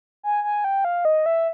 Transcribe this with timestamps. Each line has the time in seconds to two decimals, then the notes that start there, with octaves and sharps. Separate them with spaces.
0.23 G#5
0.44 G#5
0.64 G5
0.85 F5
1.05 D#5
1.26 E5